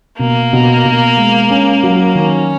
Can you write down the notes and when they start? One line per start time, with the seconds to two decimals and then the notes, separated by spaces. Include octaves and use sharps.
0.19 B2 A#3
0.53 B2
0.85 B2
1.17 G#3
1.50 C#4
1.83 F#3
2.15 D#3 C#4